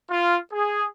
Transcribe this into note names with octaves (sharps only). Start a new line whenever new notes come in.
F4
G#4